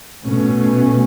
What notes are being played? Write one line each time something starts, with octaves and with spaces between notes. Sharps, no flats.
B2 A3 C#4